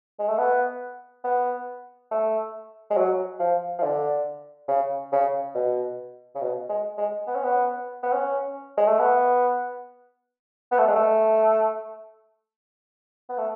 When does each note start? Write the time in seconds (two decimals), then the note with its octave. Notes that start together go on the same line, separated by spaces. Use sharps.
0.19 G#3
0.28 A3
0.38 B3
1.24 B3
2.11 A3
2.90 G#3
2.97 F#3
3.40 F3
3.78 F3
3.83 D3
4.68 C#3
5.12 C#3
5.55 B2
6.35 C#3
6.41 B2
6.69 G#3
6.98 G#3
7.27 B3
7.35 C#4
7.44 B3
8.03 B3
8.13 C#4
8.77 G#3
8.87 A3
8.99 B3
10.71 B3
10.78 A3
10.88 G#3
10.96 A3
13.29 B3
13.38 A3